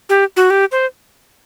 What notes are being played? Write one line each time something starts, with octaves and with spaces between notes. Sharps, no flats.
G4
F#4
G4
C5